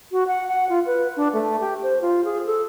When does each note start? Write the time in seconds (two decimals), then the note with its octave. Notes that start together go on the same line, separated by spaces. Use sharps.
0.12 F#4
0.28 F#5
0.48 F#5
0.69 F4
0.86 B4
1.17 D4
1.33 A3
1.60 G4
1.83 C5
2.02 F4
2.25 G#4
2.46 A4